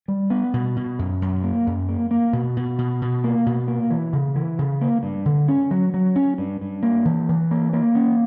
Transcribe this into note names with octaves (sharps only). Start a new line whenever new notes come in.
G3
B3
B2
B2
F#2
F#2
A#3
F#2
A#3
A#3
B2
B2
B2
B2
A#3
B2
A#3
E3
C#3
E3
C#3
A#3
G2
D3
C#4
F#3
F#3
C#4
G2
G2
A#3
E3
E3
A#3
A#3
C#4